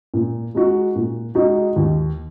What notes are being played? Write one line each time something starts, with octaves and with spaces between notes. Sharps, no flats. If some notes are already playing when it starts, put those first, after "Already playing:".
A#2
G#3 D#4 F#4
A#2
G#3 D#4 F#4
D#2